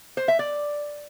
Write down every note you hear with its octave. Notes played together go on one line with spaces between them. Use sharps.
C5
E5
D5